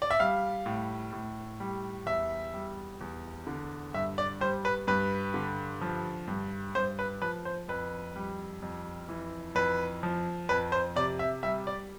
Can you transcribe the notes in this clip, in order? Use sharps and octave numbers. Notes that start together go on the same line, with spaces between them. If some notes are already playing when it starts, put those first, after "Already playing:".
D5
E5
G3 F5
A2
A2
G3
E2 E5
G3
E2
D3
G2 E5
D5
G3 C5
B4
G2 B4
D3
F3
G2
G2 C5
B4
F3 B4
C5
F2 B4
G3
F2
E3
F2 B4
F3
F2 B4
C5
C3 D5
E5
G3 E5
D5